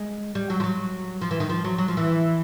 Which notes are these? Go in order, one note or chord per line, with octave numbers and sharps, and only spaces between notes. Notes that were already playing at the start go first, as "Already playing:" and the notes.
Already playing: G#3
G3
F#3
F3
F#3
F3
E3
D#3
F3
F#3
F#3
F3
E3